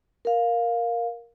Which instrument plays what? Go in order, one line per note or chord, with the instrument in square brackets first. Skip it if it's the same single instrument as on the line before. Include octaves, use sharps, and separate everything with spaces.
[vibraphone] A#4 F5